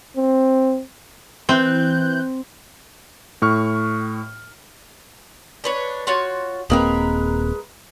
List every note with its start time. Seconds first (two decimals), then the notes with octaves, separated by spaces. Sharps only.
0.17 C4
1.49 E3 C4 F#6 G6
3.42 A2 C#6 F6
5.64 D4 B4 C#5
6.07 F4 F#4 C#5
6.70 D#1 G#3 A#3 C4 A#4 B4